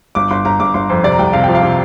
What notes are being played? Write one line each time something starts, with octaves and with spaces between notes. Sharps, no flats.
G1 D6
G1 C6
G1 A#5
G1 D6
G1 C6
F2 C5
C3 D5
A#5
C2 G5
C3 F5
F3 G5
F5
C3